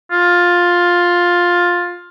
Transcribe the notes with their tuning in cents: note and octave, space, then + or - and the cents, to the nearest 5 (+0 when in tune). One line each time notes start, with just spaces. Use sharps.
F4 +10